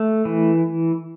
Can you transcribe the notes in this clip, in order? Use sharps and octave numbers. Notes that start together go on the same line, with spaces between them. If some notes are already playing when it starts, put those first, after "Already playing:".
Already playing: A3
E3